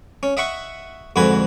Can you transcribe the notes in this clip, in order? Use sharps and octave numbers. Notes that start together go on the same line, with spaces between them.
C#4
D#5 E5 F#5 C#6
F2 G#2 D3 F#4 B4 G#5